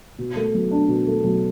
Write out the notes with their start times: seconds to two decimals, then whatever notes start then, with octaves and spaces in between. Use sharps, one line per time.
0.19 B2
0.36 A3
0.54 B1
0.71 D4
0.89 B2
1.07 A3
1.24 B1